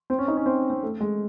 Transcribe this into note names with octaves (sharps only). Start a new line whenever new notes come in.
C4
C#4
D#4
C#4
C4
C4
A3
G#3